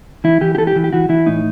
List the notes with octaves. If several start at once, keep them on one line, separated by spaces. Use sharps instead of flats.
E3 E4
E3 G4
G4
E3 A4
G4
E3
G4
E3 F#4
E3 E4
A2 D#4